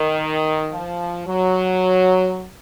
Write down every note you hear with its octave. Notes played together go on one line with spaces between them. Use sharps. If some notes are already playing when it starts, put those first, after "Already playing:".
Already playing: D#3
F3
F#3